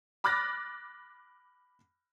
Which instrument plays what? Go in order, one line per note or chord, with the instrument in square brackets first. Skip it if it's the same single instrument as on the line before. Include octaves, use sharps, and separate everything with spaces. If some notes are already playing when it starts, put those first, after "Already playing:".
[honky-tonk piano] B5 D6 F6 F#6 A6 A#6